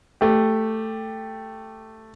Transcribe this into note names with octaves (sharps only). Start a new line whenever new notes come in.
A3 G4